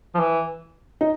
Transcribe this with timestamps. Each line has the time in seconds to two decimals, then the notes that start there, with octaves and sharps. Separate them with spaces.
0.15 F3
0.19 E3
1.01 D#4